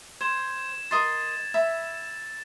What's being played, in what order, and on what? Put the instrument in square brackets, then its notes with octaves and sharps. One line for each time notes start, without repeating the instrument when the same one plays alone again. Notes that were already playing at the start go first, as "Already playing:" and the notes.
[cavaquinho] C5 [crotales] G#6 E7
[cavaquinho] A#4 D#5 C6 [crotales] A6
[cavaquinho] E5 B5